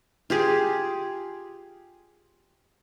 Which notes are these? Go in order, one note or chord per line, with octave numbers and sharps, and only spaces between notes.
F4 G4 G#4